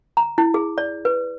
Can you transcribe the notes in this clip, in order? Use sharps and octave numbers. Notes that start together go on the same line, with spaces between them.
A#5
E4
G#4
D5
B4